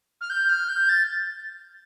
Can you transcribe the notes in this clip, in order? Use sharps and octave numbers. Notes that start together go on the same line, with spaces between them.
F6
G6
F6
G6
A6